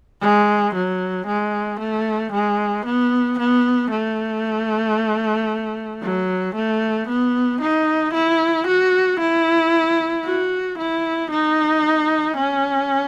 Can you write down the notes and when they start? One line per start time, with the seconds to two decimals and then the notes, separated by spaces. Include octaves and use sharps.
0.21 G#3
0.75 F#3
1.27 G#3
1.79 A3
2.32 G#3
2.85 B3
3.39 B3
3.90 A3
6.02 F#3
6.55 A3
7.08 B3
7.61 D#4
8.14 E4
8.67 F#4
9.20 E4
10.25 F#4
10.78 E4
11.30 D#4
12.36 C#4